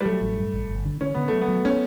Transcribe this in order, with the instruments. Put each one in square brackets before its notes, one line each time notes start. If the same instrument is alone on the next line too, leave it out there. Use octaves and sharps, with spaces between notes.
[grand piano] G3
[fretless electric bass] F#3 [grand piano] A3
[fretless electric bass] A1
G2
A1
G1
D3
[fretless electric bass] D3 [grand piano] C#4
[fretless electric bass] D3 [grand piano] B3
[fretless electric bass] F#3 [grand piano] A3
[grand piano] B3
[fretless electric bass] F#3
[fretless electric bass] B3 [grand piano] C#4